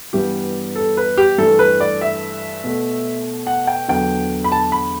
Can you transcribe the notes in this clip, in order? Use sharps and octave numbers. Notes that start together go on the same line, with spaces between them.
G2 E3 G3 B3 G4
A4
B4
G4
G2 E3 A3 A4
B4
D5
E5
B2 A3
F#5
G5
E2 D3 F#3 G5
B5
A5
B5